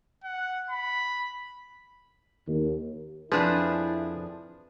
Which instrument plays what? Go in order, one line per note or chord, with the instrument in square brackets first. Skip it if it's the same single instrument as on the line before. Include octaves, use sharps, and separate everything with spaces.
[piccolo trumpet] F#5
B5
[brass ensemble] D#2
[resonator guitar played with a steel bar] F2 D4 G#4 [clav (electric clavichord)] F3 [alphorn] E4 [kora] B4